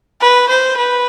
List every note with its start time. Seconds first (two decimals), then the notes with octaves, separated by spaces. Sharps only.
0.21 B4
0.49 C5
0.77 B4